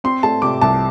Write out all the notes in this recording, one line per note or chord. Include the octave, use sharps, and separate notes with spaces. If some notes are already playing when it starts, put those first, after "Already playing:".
C4 C6
A3 A5
C3 D6
C2 A5